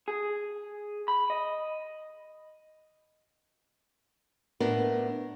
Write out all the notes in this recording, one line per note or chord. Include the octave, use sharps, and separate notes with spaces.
G#4
B5
D#5
A2 B3 D4 A#4